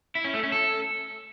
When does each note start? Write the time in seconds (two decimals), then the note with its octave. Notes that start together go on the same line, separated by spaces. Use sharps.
0.15 E4
0.25 C#4
0.34 A3
0.43 C#4
0.52 A4